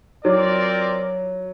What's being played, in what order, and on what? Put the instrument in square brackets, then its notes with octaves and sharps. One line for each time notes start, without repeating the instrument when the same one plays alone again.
[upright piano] F#3 [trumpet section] C4 F4 A#4 D5